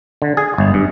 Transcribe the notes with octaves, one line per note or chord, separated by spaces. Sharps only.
D3
G#4
G1
G2